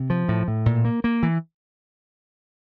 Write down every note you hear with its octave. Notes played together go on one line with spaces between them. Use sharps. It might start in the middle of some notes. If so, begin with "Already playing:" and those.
Already playing: C3
F3
A2
A2
A#2
A#3
A#3
E3